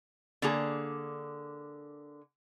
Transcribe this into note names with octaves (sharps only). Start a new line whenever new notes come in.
D3 A#3 G#4